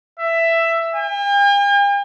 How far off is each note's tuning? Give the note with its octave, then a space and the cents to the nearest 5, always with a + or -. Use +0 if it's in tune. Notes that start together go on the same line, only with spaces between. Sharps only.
E5 +10
G5 +45